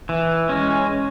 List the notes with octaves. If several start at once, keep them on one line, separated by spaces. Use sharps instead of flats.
E3
G#3 C#4